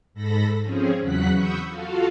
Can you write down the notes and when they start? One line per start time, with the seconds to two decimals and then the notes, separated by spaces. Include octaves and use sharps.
0.14 G#2 A4 B5 A#6
0.62 F3 C4 C#4 G#4
1.00 E2 C#3 F#3 F#5 F#6 B6
1.34 B5 C#6 D#6 E6 G6 C#7
1.68 F4 F#4 A4 F5